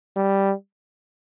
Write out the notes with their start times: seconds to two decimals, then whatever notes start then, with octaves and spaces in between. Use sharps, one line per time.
0.17 G3